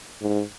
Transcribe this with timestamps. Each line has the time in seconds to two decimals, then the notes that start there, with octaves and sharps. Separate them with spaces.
0.21 G#2